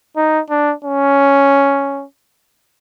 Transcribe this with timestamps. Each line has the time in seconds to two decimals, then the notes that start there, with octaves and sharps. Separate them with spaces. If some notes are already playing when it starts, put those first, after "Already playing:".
0.16 D#4
0.50 D4
0.85 C#4